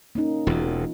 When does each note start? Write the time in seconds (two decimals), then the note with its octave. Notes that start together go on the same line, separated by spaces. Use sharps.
0.15 A#3 C#4 D#4
0.47 E1 E2 E3 F4